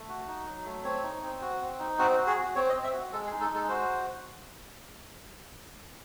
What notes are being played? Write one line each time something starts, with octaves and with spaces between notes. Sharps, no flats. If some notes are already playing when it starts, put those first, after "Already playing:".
Already playing: A3
F#4
D#4
F#3
A3
C4 C#5
D#4
C4
F#4
C4
D#4
C4 F#4
F#4
G#4
F#4
C4 C#5
D#5
C4
E5
F#4
G#3 A4
G#4
D#4
A4
G#3
A4
F#4 C5